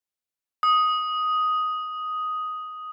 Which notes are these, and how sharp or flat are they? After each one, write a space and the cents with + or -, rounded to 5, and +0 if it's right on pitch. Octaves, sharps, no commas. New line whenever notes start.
D#6 +5